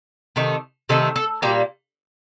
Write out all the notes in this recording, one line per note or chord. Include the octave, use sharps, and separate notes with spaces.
C3 D#3 A3
C3 D#3 A3 A4
A4
A#2 G3 A#3 G4